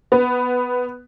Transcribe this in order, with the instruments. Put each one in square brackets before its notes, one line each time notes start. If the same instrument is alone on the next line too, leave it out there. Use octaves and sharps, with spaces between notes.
[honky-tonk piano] B3